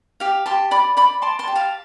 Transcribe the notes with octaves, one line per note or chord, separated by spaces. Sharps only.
G4 F5
G4 A5 C6
D5 B5 D6
D5 B5 D6
D5 A5 C6
A5 C6
G4
F5 A5